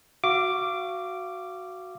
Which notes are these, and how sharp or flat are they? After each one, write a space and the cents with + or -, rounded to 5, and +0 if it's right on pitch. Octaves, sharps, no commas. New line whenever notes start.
F#4 +0 F5 -30 D6 +0